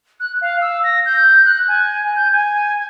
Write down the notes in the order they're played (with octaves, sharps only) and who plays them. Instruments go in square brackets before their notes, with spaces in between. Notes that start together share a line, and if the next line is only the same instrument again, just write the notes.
[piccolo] F#6
F5
E6
A#6
G6
F#6
G#5
G6
G#5